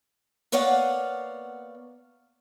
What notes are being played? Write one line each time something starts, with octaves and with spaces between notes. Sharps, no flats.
A#3 B3 C#5 D5 F5 F#5